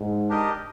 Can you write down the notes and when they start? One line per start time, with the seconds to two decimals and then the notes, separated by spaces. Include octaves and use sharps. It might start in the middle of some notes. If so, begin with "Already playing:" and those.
Already playing: G#2
0.29 D4 G4 A#4 D#5